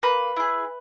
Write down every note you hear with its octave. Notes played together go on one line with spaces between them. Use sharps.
A#3 B4
E4 G#4